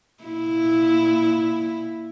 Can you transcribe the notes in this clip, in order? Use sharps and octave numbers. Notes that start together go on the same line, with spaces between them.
A#2 E4